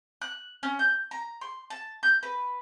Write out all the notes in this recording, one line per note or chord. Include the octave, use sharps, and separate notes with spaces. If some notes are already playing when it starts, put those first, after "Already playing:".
F#6
C#4
G6
A#5
C6
A5
G6
B4